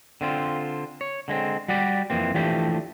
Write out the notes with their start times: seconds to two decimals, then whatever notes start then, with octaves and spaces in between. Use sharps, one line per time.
0.21 D3 C4 F4
1.01 C#5
1.28 D3 G#3 A#3 C4
1.68 G3 F#4 G4 D5
2.10 F2 E3 A#3 C4
2.34 E3 F3 A3 D4 G4